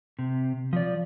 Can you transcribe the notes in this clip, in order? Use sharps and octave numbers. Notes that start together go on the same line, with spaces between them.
C3
F3 D5